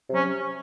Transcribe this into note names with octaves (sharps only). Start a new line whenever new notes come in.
C3 F#3 C#4